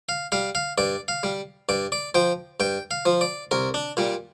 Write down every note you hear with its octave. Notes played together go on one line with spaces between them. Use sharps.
F5
G3 F5
F5
G2 D5
F5
G3
G2 D5
D5
F3 G5
G2 G5
F5
F3
D5
C2 A#4
D4
A#2 G3